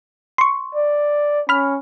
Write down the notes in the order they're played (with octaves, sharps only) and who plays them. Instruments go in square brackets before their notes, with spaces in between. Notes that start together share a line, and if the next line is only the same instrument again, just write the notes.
[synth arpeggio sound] C6 C#6
[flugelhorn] D5
[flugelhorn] C#4 [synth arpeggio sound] B5 F6